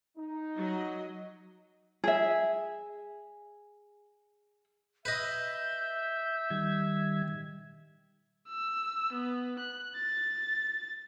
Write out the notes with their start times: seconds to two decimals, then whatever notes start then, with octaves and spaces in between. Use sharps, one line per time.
0.16 D#4
0.57 F#3 D#5
2.04 G#4 E5
5.05 B4 D#5 E5 G6
6.50 D#3 G3 G#6
8.48 E6
9.13 B3
9.59 F#6
9.96 A6